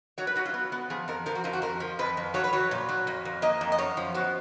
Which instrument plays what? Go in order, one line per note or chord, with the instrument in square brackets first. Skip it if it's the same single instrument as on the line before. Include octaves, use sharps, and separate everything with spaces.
[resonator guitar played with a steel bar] F#3 C#5
B4
F#3 F#4
F4
B3
B3
F3 G#4
F2 A#4
F3 A#4
F#4
F2 F4
F#4
F2 A#4
F3
F2 B4
F2
F#3 C#5
B4
F#3 C#5
A#2
F#3
F2
F2
A#3 D#5
F2
D#5
F#2 C#5
F3
B3 F#4